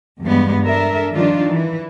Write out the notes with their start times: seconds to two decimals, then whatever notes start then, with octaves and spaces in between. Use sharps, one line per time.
0.21 E2 G2 G#3 B3
0.66 D4 A4 A#4 E5
1.11 D#3 F3 G3 D4 D#4 F4
1.50 E3